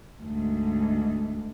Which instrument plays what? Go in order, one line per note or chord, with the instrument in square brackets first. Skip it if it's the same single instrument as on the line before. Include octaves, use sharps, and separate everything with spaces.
[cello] D2 G#2